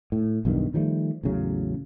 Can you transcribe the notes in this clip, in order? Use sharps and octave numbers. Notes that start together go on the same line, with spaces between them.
A2
B1 E2 G2 D#3
D#3 F3 G3 A3
A1 E2 C#3 F#3